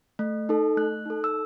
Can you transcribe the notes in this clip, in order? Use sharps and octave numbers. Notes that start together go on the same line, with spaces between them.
A3
D#4 A4
A3 F#6
D#4 A4
E6